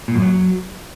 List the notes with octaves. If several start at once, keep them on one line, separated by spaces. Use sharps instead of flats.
A#2
F#2
F#3